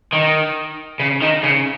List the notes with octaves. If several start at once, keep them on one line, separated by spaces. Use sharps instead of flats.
D#3
C#3
D#3
C#3